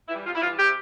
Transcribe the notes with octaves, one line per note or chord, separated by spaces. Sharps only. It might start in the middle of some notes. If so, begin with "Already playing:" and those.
E3 G3 E4
C3 F4
E4
E3 G3 F4
C3 G4